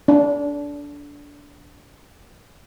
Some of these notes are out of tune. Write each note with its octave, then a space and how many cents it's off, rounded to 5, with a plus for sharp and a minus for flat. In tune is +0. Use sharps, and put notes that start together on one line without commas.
D4 -20